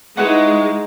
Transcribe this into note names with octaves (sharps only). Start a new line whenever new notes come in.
G#3 D#4 E4 B4 F#5 C#6